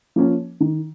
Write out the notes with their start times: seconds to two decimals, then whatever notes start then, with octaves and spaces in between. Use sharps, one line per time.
0.16 F3 A#3 C#4
0.60 D#3